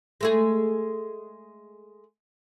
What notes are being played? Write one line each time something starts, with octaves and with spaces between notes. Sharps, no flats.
G#3 A3 G#4